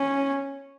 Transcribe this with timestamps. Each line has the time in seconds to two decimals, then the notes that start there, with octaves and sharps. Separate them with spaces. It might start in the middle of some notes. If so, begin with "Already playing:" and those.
Already playing: C#4